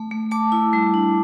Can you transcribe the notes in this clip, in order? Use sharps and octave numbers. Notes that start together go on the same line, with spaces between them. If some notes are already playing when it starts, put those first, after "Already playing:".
Already playing: A3
A3
A3 A5 D6
E4
G3
D4